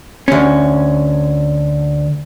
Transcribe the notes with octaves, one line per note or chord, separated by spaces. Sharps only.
D2 C#4